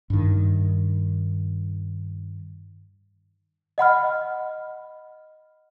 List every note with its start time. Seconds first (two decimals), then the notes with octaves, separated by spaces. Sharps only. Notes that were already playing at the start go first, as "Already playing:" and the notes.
0.10 G2 D#3
3.78 D#5 F#5 B5 F6